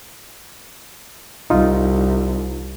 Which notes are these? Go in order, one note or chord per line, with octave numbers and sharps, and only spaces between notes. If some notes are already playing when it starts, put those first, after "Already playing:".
C2 D#4 F4